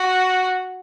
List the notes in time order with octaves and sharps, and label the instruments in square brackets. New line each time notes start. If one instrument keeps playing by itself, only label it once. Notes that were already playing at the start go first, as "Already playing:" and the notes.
Already playing: [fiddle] F#4